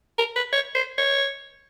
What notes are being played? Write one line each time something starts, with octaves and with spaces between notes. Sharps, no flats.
A#4
B4
C#5
C5
C#5